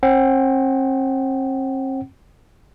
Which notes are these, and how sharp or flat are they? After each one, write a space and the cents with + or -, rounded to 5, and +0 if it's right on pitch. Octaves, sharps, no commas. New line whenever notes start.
C4 +40 F#5 +35